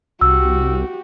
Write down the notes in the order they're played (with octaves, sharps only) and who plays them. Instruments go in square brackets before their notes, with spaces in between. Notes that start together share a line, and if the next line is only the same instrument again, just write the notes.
[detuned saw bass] C2 [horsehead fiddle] F#4 G4 [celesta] E6